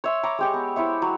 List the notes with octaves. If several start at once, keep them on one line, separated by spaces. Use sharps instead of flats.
C#5 E5 C6
C#5 A#5 B5 D6
G#3 G4 C#6
B3
E4 C5 C#5 E5
F#3